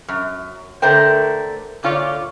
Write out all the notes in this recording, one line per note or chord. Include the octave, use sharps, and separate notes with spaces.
F#2
D3 A3 A#4 C5 G5
A#2 D3 F4 C#5 D5